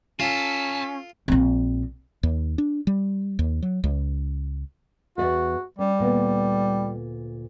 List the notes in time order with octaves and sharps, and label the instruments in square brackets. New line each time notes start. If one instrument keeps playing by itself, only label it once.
[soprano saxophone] C#4 [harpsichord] F4 [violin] A4 B6 [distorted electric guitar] G#5 A5
[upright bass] A#1 C4
[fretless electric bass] D#2
D4
G3
D#2
F#3
C#2
[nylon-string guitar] E2 D5 E5 [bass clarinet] F#4
[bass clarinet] G3 [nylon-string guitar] C#4
[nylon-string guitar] D2 A#2 B3